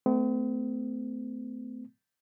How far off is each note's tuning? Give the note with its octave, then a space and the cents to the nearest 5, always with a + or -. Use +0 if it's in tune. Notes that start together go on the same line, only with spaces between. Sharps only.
A3 +0 C4 -45